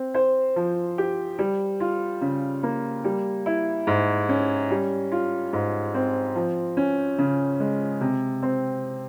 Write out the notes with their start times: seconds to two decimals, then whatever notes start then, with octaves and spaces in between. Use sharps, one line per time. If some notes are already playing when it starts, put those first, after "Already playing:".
Already playing: C4
0.14 C5
0.56 F3
0.98 G4
1.39 G3
1.80 F4
2.22 C#3
2.63 A#3
3.04 G3
3.46 E4
3.87 G#2
4.29 C#4
4.70 G3
5.12 F4
5.53 G#2
5.94 C4
6.35 F3
6.77 C#4
7.18 C#3
7.60 G#3
8.01 C3
8.43 C4